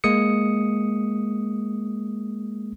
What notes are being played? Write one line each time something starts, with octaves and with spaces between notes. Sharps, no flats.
G#3 A#3 D#6 C#7